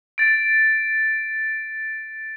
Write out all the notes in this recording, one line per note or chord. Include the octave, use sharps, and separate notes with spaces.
A6 D7